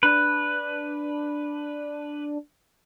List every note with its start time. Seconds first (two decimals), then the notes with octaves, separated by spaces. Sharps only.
0.03 D4 B4